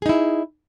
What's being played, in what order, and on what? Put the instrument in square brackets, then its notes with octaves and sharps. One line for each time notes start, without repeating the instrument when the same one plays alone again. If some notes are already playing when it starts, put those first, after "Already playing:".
[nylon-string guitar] G#4
D#4
E4